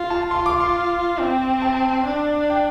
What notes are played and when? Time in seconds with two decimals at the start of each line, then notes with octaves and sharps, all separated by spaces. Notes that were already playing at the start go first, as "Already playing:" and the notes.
Already playing: F4
0.10 A5
0.31 F4 C6
0.46 D6
0.60 C6
1.19 C4
1.62 A5
2.06 D4
2.50 G5